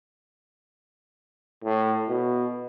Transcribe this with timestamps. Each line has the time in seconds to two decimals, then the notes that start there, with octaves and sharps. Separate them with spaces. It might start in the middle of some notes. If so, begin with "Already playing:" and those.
1.64 A2
2.09 B2